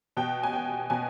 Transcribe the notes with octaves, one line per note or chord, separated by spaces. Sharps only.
B2 G5
G#5
G5
B2 G#5